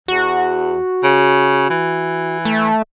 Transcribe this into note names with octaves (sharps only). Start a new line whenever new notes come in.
E2 F#4
C#3
E3
A3